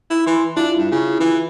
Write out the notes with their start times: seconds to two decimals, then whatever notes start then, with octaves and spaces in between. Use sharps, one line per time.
0.10 E4
0.26 E3 C6
0.57 D4 E4 F4
0.77 G2
0.91 C#3
1.20 E3